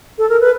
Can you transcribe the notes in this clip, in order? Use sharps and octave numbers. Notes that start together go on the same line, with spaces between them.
A4
A#4
B4